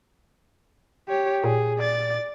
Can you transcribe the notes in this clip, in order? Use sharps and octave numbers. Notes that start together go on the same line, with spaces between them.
G4 C#5
A#2 G#4
D5 A6